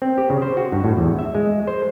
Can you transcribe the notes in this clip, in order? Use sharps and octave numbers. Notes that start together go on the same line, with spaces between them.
C4
G4
C#3
C5
F#4
G2
A2
E2
E5
G#3
C5